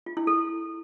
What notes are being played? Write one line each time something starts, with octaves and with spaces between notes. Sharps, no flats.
F4
E4
A4